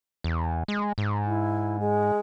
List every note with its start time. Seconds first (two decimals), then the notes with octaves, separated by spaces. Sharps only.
0.24 E2
0.68 G#3
0.98 G#2
1.26 E4
1.79 G#3